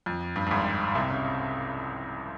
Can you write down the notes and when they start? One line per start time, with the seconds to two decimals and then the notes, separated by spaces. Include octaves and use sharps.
0.06 F2
0.36 G2
0.46 G2
0.51 G#1 G#2
0.95 C2 C3
1.10 C#3